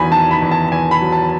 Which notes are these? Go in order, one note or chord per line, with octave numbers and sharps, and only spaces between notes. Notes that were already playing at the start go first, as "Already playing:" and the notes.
Already playing: E2 D#3 F#3 G#5 B5
D#3 A5
B5
E2
A5
E2 G#5
B5
F#3
A5